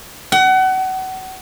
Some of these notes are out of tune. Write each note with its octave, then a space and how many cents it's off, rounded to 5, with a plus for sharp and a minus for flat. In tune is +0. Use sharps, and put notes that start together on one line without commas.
F#5 +30